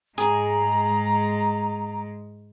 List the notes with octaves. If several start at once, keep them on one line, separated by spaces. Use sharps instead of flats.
G#2 G#3 G#4 A#5